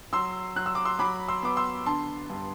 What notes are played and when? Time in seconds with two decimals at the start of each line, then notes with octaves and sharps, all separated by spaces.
0.13 F#3 C6 E6
0.56 F#3 F#6
0.66 E6
0.75 D6
0.85 C6 E6
0.99 F#3 B5 D6
1.28 C6 E6
1.43 B3 D6
1.57 C6 E6
1.86 D3 A5 C6
2.30 G2